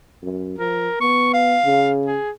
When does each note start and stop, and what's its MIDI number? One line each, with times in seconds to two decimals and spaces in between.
0.22 0.54 42
0.58 0.88 53
0.58 0.96 70
1.01 1.58 59
1.01 1.31 85
1.33 1.90 77
1.65 2.17 49
2.06 2.30 68